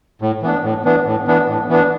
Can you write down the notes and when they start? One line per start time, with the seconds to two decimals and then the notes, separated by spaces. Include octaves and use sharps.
0.22 A2
0.43 E3 B3 D4
0.64 A2
0.85 E3 B3 D4
1.06 A2
1.27 E3 B3 D4
1.48 A2
1.69 E3 B3 D4